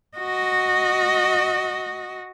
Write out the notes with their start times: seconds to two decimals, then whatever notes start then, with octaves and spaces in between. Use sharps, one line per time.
0.18 F#4 D#5